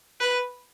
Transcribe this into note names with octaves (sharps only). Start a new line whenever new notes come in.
B4